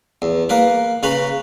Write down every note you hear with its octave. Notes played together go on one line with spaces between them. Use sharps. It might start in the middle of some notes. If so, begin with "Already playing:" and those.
E2
A#3 A#4 B4
C#3 C#4 B4 A#5 B5